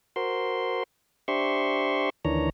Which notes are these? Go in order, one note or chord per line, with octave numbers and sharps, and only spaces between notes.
F#4 A#4 C5 C6
D4 G4 C5 E5 C6 C#6
D2 D#3 E3 D4 C#5 A#5